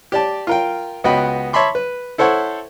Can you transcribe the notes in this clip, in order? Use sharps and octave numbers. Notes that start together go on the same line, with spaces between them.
G4 D5 A5
F4 A#4 G5
C#2 B3 F#4 D#5 G5 B5
C#5 E5 A5 B5 C6 D6
B4
E4 A4 C5 C#5 F#5